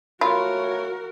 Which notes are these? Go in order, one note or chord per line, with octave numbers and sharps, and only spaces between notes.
F#2 A3 F4 F#4 A#4 C#5 B5